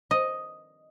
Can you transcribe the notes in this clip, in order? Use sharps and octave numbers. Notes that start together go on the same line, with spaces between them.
D#5